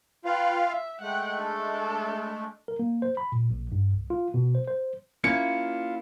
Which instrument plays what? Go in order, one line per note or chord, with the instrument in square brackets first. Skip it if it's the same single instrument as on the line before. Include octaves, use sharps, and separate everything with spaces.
[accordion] F4 F5 [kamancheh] B4 G5
[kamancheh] E5
[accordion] G#3 A3 [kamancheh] F#5 G5
[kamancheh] D4 A4
[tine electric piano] A#4
A#3
C5
B5
A#2
A#1
G2
C2
F4
B2
C5
C5
[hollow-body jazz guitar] A#3 C#4 E4 [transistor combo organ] F4 [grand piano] C#7